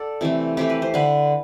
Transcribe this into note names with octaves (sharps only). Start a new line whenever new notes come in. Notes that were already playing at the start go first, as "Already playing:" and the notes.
Already playing: A4 D5 F#5
C3 E3 A3
C3 E3 A3 G4
B4
C5
D3 B4